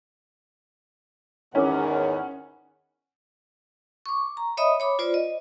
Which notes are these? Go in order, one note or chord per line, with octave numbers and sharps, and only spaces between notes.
E2 G#2 D#3 C#4 E4 A#4 F#5 D6
C#6 D6
A#5
C#5 D#5 E5 B5 D#6
C#5 B5 D6
F4 C5 D5
D#5